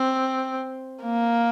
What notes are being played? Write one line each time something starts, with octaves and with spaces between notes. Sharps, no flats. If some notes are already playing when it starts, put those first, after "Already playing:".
Already playing: C4
A#3